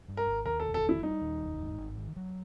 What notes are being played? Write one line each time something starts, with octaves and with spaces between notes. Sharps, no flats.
G2
A#4
G#1
D#2 A#4
A4
F1
A4
D#3
E4
G3 D#4
D#2
F1
G#2
G#1
D#3
F#3